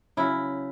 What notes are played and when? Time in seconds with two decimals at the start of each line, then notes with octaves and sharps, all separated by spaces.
0.17 C#3 F#3 E4